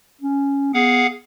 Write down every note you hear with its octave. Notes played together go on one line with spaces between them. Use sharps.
C#4
B3 G#4 F5 F#5